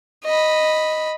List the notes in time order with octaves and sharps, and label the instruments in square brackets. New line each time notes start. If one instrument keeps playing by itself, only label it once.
[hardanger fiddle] D#5 B5